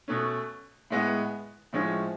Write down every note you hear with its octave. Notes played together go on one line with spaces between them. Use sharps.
B2 A3 C#4
A2 G#3 B3
A2 F3 G#3 C#4